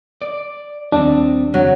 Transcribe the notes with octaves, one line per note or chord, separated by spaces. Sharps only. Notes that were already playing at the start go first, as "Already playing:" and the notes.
D5
D#2 G3 C4 D4
F2 A#2 C#3 F#3